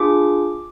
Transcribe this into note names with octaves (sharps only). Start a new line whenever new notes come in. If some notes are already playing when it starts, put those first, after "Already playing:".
Already playing: D4 F4 G#4 D6